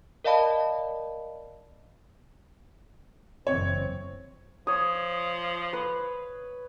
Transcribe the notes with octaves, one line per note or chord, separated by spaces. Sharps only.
A#4 D5 D#5 F5 A5 B5
F#1 E3 C4 C#5
F3 C#5 D#6
B4